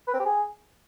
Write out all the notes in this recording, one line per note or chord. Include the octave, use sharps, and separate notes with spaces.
B4
C4
G4
G#4